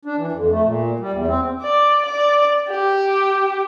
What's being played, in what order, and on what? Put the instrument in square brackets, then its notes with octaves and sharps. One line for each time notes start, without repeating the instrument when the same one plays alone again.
[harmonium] D4
E3
F2
A3
A#2
G3
E2
C4
[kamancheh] D5
D5
G4